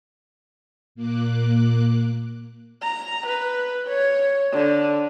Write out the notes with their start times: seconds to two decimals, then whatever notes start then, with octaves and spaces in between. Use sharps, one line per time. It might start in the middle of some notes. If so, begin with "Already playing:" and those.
0.95 A#2 A#3 D6 F#6
2.82 A#5
3.27 B4
3.87 C#5
4.52 D3